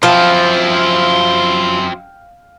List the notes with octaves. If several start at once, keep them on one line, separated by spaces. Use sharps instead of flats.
F#2 F3 C4 E4 F4 F5 G5